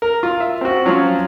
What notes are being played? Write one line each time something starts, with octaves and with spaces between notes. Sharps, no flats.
A#4
F4
E5
C4 F#4
F3 F#3 C#4 F4